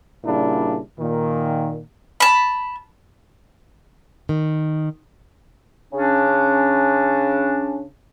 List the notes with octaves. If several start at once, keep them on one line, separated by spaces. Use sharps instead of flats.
A#2 C#3 G3 D4 E4
A#2 D#3
A5 B5
D#3
C#3 C#4 D4